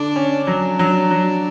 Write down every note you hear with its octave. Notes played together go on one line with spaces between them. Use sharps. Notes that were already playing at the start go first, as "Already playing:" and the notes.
Already playing: D3 D4
C#4
F#3 D4
F#3
F#3